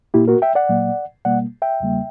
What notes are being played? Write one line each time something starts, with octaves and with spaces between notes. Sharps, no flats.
A#2 A#3 E4 G4
F#4 A#4
E5 G5
D5 F#5
A#2 F#3 A#3
B2 G3 A#3 D5 F#5
E5 G5
E2 C#3 G3 A#3